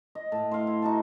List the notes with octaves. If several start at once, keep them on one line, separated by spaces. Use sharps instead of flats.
D#5
A2 A5
C5 F5
E4
D#4 F#4 A5